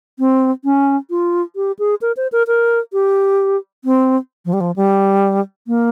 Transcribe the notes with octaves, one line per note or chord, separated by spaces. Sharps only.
C4
C#4
F4
G4
G#4
A#4
C5
A#4
A#4
G4
C4
F3
G3
F3
G3
A#3